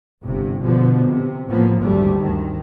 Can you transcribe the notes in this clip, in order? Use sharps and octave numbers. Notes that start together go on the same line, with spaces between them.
G1 G2 C3
B2 D3 F3 B3
C3
A2 F3 A#3 B3
G#1 D2 G2 G3 A3
D2 D#3